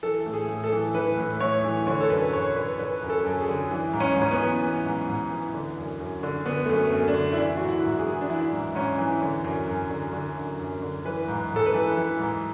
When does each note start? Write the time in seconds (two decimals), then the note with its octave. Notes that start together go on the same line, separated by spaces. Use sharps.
0.03 E3 A4
0.26 A2
0.33 G#4
0.49 A2
0.64 A4
0.72 E3
0.94 E3 B4
1.18 A2
1.40 A2 C#5
1.64 E3
1.87 D3 C#5
2.01 A4
2.10 F#2 B4
2.33 F#2 C#5
2.55 D3 B4
2.78 D3 B4
3.02 F#2
3.10 A4
3.24 F#2
3.40 G#4
3.48 D3
3.71 E3
3.93 G#2
4.00 C#4
4.16 G#2
4.22 C#4
4.31 B3
4.39 E3
4.62 E3
4.85 G#2
5.08 G#2
5.31 E3
5.54 D3
5.78 F#2
6.00 F#2
6.23 D3
6.46 D3 B3
6.66 F#2 A3
6.76 B3
6.92 F#2
7.08 D4
7.14 D3
7.32 E4
7.37 E3 D4
7.57 G#2 F#4
7.69 E4
7.83 G#2
7.99 G#4
8.07 E3
8.21 D4
8.29 E3 E4
8.53 G#2
8.75 G#2 C#4
8.98 E3
9.21 D3
9.44 F#2
9.68 F#2
9.90 D3
10.13 D3
10.36 F#2
10.59 F#2
10.82 D3
11.05 E3 B4
11.28 G#2
11.51 G#2
11.56 A4
11.66 B4
11.74 E3
11.97 E3
12.19 G#2